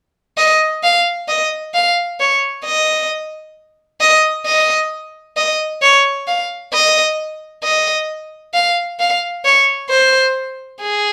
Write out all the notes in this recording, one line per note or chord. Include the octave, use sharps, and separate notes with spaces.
D#5
F5
D#5
F5
C#5
D#5
D#5
D#5
D#5
C#5
F5
D#5
D#5
F5
F5
C#5
C5
G#4